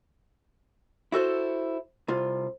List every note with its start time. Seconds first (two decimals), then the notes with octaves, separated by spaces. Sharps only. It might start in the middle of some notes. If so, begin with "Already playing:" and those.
1.12 E4 F#4 A4 C5
2.08 C2 F4